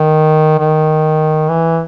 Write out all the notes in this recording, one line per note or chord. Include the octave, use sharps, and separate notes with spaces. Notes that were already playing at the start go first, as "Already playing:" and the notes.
Already playing: D#3
D#3
E3